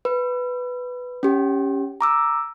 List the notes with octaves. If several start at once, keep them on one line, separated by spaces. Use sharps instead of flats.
B4
C#4 G4
A#5 D6 E6